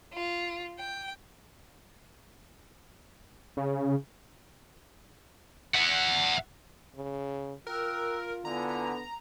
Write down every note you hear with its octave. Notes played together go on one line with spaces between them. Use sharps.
F4
G5
C#3
E5 F#5
C#3
F4 A#4 G5 E6 F#6
D3 B3 E4 B4 G#5 A#5